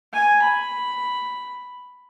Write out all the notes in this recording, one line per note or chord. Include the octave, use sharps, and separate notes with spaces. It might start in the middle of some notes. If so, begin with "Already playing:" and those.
G#5
B5